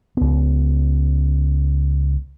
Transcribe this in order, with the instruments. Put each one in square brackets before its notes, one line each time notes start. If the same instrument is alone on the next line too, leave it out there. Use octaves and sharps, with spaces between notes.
[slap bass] C#2 B3